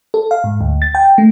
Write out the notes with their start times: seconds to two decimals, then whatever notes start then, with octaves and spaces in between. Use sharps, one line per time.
0.14 A4
0.31 F5
0.44 G#2
0.61 D2
0.82 A6
0.95 G5
1.18 A3